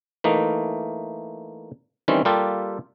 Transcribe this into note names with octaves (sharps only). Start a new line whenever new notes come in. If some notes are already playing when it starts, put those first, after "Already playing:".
E3 A3 A#3 D#4
D#3 E3 G3 C4 C#4
G3 A#3 F4 G4 A4